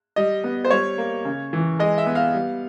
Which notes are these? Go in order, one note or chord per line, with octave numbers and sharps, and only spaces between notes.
G3 D#5
B3
C5
G3 C#5
A#3
C#3
E3
G#3 D#5
E5
B3
F5
G3